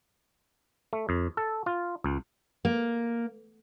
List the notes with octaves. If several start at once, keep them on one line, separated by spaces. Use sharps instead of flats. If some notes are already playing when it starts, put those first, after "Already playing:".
A3
F2
A4
F4
C#2
A#3